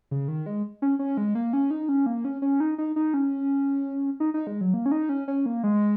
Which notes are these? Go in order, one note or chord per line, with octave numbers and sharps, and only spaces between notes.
C#3
D#3
G#3
C#4
C#4
G#3
A#3
C#4
D#4
C#4
A#3
C#4
C#4
D#4
D#4
D#4
C#4
D#4
D#4
G#3
F#3
A#3
C#4
D#4
C#4
C#4
A#3
G#3